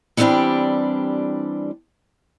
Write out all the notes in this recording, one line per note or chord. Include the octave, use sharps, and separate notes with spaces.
E3 G3 B3 C4 D4 G4